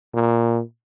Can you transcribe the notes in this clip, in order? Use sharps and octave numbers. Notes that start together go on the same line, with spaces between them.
A#2